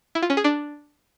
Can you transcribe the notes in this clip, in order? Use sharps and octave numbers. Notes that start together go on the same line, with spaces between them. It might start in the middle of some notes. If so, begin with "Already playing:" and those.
E4
F4
C#4
G#4
D4